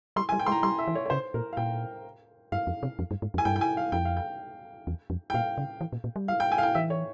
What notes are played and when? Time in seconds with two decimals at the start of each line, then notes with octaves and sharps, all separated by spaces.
0.16 G3 C6
0.29 G#5
0.32 G3
0.39 G5
0.46 G#3 C6
0.52 A#5
0.63 G3 C6
0.79 E5
0.88 E3
0.95 C#5
1.06 C#5
1.10 C#3 C5
1.34 A#2 A#4
1.53 F5
1.57 A#2 G5
2.52 G2 F5
2.67 F2
2.83 C3
2.99 F2
3.11 G2
3.22 G#2
3.34 F2
3.38 G#5
3.45 G2 G5
3.56 G5
3.61 G#5
3.77 F5
3.92 F2 G5
4.05 F5
4.17 G5
4.87 E2
5.10 F2
5.30 G5
5.34 A#2 F5
5.58 C#3
5.81 E3
5.93 A#2
6.04 A#2
6.16 G3
6.28 F5
6.40 G5
6.52 G#5
6.58 F5
6.63 G5
6.75 E3 E5
6.90 C#5